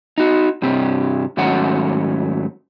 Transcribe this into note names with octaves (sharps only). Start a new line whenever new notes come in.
D#4 F#4
G2 C3 C4 G4
G#2 D#3 F#3 A3 C#4 F#5